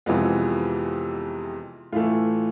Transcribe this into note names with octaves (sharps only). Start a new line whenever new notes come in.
F2 C3 E3 G#3 B3 F4
A2 E3 A3 F4